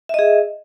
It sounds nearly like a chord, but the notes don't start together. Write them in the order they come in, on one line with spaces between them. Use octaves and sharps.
E5 D#5 G#4